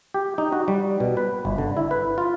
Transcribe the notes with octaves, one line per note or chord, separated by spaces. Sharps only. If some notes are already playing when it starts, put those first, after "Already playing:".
G4
D#4
F#4
G3
B2
B4
G1
D3
E4
B4
F4